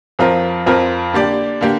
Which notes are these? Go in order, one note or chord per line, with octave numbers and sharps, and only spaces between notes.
F2 F3 C4 F4 A#4
F2 F3 C4 F4 A#4
D3 A#3 G4 D5
D3 A#3 G4